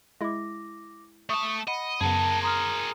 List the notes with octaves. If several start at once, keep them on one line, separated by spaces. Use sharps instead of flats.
G#3 E4 D6 A#6
A3 A5 C#6 D#6
D#5 F#5 B5 C#7
F#2 C#3 B3 G#4 A#4 A5
A#5 C6 D#6 F6